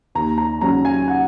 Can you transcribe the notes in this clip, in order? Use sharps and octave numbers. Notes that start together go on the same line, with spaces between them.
D#2 A#5
A#5
C#3 F#3 C#4 A#5
G#5
F#5